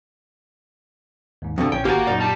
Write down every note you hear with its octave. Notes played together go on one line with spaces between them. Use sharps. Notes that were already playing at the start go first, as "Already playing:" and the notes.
D#2 G#2
F2 B2 D3 G4 D5
A#1 C#4 E4 G5 G6
G#1 A#3 F#4 G4 A#4 G#5 D6 A6
F#2 A#2 D#4 D5
G3 A5